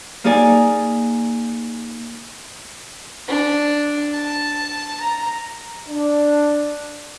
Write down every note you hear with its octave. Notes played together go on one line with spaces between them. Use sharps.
A#3 D#4 G#4 D5 G#5
D4
A5
A#5
D4